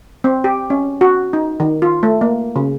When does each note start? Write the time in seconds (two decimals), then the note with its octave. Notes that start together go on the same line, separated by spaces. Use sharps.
0.24 C4
0.44 G4
0.70 C#4
1.01 F#4
1.33 D#4
1.60 D#3
1.82 F4
2.03 A3
2.21 A#3
2.56 C#3